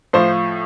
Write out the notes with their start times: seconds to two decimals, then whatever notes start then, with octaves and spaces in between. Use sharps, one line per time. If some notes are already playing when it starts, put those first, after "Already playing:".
0.13 A2 F3 C5